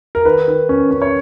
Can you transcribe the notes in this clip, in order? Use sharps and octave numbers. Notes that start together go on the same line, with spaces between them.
A#4
D#3 B4
D#3
C#4
C#4
C#5